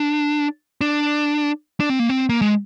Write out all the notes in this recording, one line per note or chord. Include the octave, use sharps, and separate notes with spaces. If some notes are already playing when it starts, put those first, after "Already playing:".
Already playing: D4
D4
D4
C4
A#3
C4
A#3
G#3